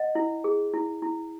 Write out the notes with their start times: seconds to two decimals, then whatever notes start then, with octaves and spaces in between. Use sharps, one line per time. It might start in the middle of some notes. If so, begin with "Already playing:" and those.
Already playing: D#5 F#5
0.15 E4
0.44 G#4
0.74 E4
1.02 E4